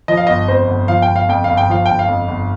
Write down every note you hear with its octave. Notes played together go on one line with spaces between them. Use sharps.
F3 D#5
F5
G1 D#5
F2 C5
G1
F3 F5
G5
G1
F5
F2 G5
G1 F5
G5
F3 F5
G1 G5
F5
F2
G1